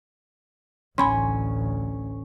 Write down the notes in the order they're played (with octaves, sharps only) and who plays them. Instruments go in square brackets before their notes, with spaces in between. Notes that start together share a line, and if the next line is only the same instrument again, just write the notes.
[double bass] A1 D2 [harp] C#4 [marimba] G#5 B5 C6